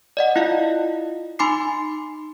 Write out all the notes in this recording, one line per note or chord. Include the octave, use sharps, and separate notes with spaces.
D5 D#5 F#5
E4 F4 D#5 F5
D#4 G#5 B5 C6 D6 C7